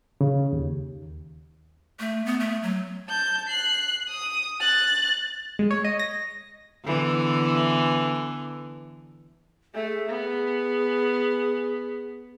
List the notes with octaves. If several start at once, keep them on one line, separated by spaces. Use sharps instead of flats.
C#3
D#2
A3
B3
A3
F#3
A5 G6
F#6 C7
D#6
F#6 A6
G#3
C#5
D#5
A#6
D3 E3 B3
A3 G#4
B3